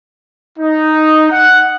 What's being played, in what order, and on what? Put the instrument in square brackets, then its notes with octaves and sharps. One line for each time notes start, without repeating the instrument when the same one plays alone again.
[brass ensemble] D#4
F#5